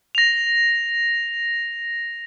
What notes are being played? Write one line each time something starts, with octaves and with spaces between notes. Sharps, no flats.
A#6 F7